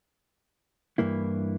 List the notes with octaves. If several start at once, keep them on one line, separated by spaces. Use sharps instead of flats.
G2 E3 A#3 E4